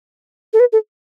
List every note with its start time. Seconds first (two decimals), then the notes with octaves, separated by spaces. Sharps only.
0.53 A4
0.60 B4
0.72 A4